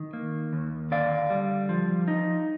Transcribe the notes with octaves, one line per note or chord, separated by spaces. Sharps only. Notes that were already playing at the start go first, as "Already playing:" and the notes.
Already playing: D#3
A#3
D#2
D3 D5 F5
G3
F3
D#4